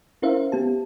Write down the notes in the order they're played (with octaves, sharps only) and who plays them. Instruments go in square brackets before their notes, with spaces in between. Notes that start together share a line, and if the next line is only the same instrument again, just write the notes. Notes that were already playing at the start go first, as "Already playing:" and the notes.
[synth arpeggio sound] C#4 E4 A#4 C5 E5 F5
B3 G4 A5